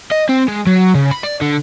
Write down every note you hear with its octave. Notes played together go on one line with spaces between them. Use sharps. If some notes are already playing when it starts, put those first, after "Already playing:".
D#5
C4
G#3
F#3
C#3
B5
D5
D3